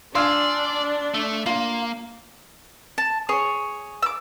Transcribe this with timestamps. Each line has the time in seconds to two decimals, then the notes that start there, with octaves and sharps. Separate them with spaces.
0.15 D4 F4 D5 G#5 C6 E6 F6
1.14 A3
1.46 A#3 F4
2.98 A5
3.29 G#4 C#5
4.03 D6 E6